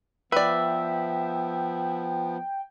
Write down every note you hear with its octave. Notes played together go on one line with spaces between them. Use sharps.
F3 B3 B4 D5 E5 G5